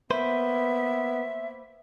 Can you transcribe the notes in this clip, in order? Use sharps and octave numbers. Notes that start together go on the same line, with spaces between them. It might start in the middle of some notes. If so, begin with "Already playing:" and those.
A#3 B3 B4 C5 E5